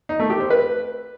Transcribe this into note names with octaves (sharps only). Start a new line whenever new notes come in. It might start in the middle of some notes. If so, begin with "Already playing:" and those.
D#4
A3
G4
C5
B4